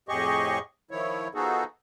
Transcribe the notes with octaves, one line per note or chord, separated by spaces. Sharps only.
F2 A2 G4 G#4 D#5 C#6
D#3 F3 E4 C#5
F3 B3 D#4 F#4 G#4 A4